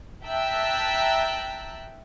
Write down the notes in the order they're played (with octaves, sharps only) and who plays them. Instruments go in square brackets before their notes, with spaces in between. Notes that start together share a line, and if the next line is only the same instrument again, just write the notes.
[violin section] E5 G5 A5 A#5 E6 F#6